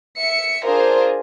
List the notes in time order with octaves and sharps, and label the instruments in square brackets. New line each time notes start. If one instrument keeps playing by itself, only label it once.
[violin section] E5 C#7
D4 F4 G#4 A#4 C5